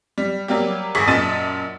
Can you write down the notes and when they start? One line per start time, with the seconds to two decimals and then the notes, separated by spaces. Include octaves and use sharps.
0.18 G3
0.48 F#3 G3 A#3 G4
0.95 G#1 G#4 C#6 B6
1.07 F#2 A#2 D#5 A5 A6 D#7